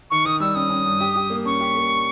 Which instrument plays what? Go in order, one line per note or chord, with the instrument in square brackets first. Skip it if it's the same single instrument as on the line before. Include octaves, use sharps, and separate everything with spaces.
[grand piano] D#3 [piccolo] C#6
[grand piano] D#3 [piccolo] D#6
[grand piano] G3 [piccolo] E6
[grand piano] C#4 [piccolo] D#6
[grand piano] C#4
G2
G4
G4
A#3
[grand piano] C#4 [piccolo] C#6
[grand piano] G4
A#3